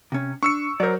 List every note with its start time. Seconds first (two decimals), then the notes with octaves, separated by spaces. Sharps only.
0.12 C3 C#4
0.43 D4 C#6 E6 C#7
0.80 F#3 A#4 C5 D5